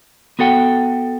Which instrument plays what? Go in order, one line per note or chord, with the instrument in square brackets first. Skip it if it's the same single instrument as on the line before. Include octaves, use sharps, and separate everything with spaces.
[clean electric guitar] B3 F#4 A4 F#5 G5